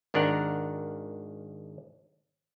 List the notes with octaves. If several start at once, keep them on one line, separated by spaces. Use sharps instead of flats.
G#1 D#3 D4 A#4 F#5